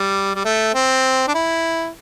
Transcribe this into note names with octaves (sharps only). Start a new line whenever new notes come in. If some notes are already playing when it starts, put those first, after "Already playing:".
Already playing: G3
G3
A3
C4
D4
E4